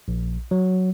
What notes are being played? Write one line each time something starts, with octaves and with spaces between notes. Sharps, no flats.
A#1
F#3